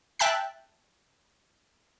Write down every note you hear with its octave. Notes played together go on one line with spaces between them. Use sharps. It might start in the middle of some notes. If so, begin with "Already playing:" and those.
E5 G5 A5 F#6 B6